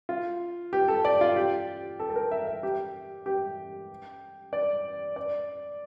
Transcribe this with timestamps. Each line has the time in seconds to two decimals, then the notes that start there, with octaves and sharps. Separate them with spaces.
0.09 F4
0.73 G4
0.88 A4
1.05 D5
1.21 F4
1.36 G4
2.00 A4
2.10 A4
2.16 A#4
2.31 E5
2.47 E5
2.63 G4
3.26 G4
4.53 D5
5.16 D5